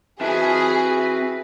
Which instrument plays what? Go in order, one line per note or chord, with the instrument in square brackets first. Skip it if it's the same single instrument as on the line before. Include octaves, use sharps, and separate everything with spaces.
[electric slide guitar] C4 A5 [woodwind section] E4 F#4 B4 [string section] G#4